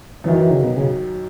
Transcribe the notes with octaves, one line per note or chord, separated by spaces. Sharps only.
F#2 D#3 E3 F#3
E3
C#3
B2
C#3